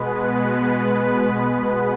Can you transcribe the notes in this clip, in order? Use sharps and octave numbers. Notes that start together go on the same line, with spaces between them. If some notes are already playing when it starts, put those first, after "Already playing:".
Already playing: B2 G#3 B3 B4
B4